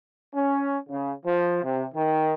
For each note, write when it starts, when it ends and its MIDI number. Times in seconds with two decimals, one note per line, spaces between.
0.35 0.77 61
0.89 1.12 49
1.26 1.60 53
1.63 1.84 48
1.95 2.34 51